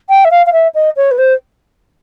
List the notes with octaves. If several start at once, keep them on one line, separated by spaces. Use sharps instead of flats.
G5
E5
F5
F5
E5
D#5
C#5
B4
C5